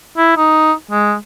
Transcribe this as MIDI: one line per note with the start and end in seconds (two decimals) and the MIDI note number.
0.17 0.33 64
0.37 0.73 63
0.91 1.15 56